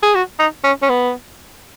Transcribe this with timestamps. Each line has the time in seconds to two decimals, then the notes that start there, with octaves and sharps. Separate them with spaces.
0.03 G#4
0.15 F#4
0.39 D#4
0.64 C#4
0.82 C#4
0.89 B3